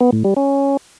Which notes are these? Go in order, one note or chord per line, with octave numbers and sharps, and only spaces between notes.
B3
A2
G3
C#4